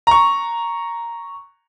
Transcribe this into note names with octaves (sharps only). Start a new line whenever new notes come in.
A#5 C#6